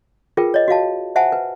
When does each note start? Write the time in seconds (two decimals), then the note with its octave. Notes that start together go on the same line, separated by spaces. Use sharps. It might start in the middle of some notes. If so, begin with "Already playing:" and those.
0.37 F4 G#4 A#4 B4 G5
0.54 C#5 D#5
0.68 F#4 D#5 F5 A5
1.16 C5 E5 F#5 G#5 A5
1.32 B4